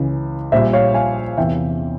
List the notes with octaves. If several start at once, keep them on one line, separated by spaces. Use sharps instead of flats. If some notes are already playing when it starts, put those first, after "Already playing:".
Already playing: C#2 C#3 E3
A#1 A#2 G3 C5 E5
C#5 F5
F5 G#5
E2 C3 E3 E5 G5